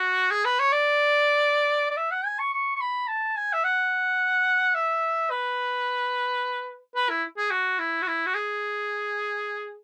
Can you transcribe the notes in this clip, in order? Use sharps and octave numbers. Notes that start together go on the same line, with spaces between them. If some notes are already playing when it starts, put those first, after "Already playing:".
Already playing: F#4
G#4
B4
C#5
D5
D5
E5
F#5
G#5
C#6
C#6
C#6
B5
A5
G#5
E5
F#5
E5
B4
B4
E4
G#4
F#4
E4
F#4
E4
F#4
G#4